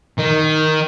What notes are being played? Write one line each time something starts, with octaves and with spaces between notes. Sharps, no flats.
D#3